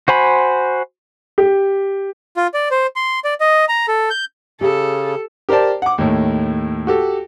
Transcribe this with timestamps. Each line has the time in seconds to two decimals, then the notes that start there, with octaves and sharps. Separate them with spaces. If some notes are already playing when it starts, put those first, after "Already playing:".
0.08 F#4 C5 G#5 B5
1.38 G4
2.37 F4
2.54 D5
2.71 C5
2.96 C6
3.24 D5
3.40 D#5
3.69 A#5
3.88 A4
4.10 G6
4.61 C#3 G4 A4
5.49 G4 A#4 C5 D5 A5
5.82 F#5 D6
5.98 D#2 A2
6.87 F#4 G4 A4